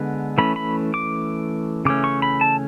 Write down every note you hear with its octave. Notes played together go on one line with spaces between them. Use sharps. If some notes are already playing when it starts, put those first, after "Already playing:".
Already playing: D3 G#3 B3
E3 A3 C#4 B5
B5
D6
C#3 E3 A3 C#4 D6
C#6
B5
A5